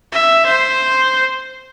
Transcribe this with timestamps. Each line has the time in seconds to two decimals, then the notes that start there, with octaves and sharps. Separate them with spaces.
0.12 E5
0.46 C5